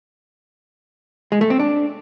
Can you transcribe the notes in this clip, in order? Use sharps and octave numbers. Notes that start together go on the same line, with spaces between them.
G#3
A3
C4
D4